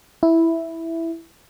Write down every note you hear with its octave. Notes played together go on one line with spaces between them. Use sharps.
E4